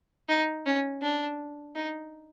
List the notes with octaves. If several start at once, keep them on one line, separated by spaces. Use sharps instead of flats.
D#4
C#4
D4
D#4